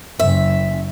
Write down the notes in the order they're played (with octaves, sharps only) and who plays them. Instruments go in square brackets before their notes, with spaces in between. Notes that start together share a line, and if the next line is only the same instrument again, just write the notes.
[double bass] F#1 [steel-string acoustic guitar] E5